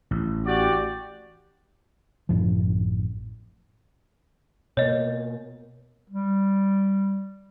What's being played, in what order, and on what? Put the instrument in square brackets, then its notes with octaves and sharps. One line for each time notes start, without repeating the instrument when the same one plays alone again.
[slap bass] A1
[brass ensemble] F#4 G4 D5
[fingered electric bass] A1 F#2 A2 F3
[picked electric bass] B2 A#3 [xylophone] C#5 D#5
[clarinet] G3